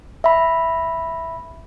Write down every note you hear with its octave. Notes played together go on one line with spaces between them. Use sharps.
E5 B5